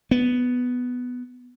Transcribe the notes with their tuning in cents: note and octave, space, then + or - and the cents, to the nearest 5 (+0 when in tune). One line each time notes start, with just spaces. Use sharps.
B3 +5